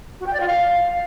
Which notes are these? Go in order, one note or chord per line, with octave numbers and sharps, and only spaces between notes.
F#4
G5
D5
F4
F5